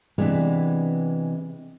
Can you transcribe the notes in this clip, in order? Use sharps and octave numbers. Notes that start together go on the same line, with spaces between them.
C3 E3 G#3 B3 D4